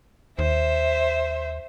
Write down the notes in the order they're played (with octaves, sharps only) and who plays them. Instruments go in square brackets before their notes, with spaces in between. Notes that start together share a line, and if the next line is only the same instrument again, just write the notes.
[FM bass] D#2 [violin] C5 E5